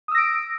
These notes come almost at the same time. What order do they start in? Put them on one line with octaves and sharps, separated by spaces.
D#6 E6 A#6 D7